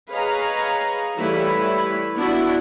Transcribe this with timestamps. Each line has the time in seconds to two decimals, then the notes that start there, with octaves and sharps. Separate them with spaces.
0.10 G#4 B4 C#5 D#5 F5 A#5
1.17 E3 G3 A3 E4 B4 C#5
2.16 B3 D4 E4 F#4